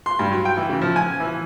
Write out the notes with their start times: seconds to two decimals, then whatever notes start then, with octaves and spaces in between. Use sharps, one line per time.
0.06 C6
0.19 G2
0.31 F#3
0.45 G5
0.57 E3
0.69 C#3
0.82 F3
0.96 G#5
1.20 E3